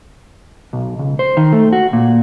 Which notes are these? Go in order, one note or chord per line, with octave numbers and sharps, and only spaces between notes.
B1
C#2
C5
D#3
A3
F#4
A#2